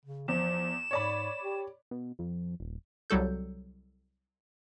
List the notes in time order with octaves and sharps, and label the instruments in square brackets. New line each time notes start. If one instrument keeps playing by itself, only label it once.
[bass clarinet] C#3
[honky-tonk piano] E2 [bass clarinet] F3 [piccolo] E7
[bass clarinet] G#2 [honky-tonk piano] C#5 D5 B5
[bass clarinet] G4
[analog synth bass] B2
F2
D#1
[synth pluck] C2 F#3 G3 F#4 A4 G6